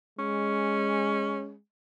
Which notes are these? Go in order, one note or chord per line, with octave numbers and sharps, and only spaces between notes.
G#3 C#4